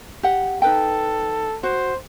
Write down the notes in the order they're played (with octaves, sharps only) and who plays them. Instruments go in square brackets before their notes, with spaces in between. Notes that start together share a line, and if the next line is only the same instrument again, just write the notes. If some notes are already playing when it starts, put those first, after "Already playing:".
[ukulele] G4 F#5
[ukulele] D#4 B4 G5 [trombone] A4
[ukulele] F#4 [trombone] C5